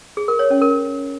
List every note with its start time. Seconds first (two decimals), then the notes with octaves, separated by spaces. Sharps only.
0.17 G#4
0.28 A#4
0.39 C#5
0.50 C#4
0.61 A#4